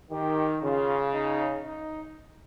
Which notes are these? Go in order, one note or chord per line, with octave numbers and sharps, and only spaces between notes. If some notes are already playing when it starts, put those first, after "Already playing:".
D#3 G4
C#3 F4
D#4
D#4